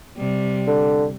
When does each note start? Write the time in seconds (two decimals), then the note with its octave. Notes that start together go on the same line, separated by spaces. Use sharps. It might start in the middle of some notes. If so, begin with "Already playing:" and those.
0.17 C3 G3
0.67 D3